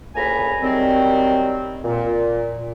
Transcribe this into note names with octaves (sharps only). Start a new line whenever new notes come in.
D2 A#2 C#3 G#5 A#5 B5
D#3 F#3 G3 C4
A#2